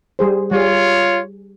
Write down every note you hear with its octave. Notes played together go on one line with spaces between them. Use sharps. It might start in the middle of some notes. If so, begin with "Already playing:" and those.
G3 G#4 C5
G3 F4 G#4 C#5